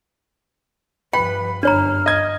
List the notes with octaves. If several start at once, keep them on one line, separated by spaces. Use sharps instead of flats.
G2 F3 B4 G5 B5
G1 F#2 D4 C#5 A#5 F6
D#5 G#6